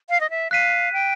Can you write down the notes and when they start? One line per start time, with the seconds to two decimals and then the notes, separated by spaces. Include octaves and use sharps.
0.10 F5
0.21 D#5
0.30 E5
0.51 F5 F#6 B6 D#7
0.93 G5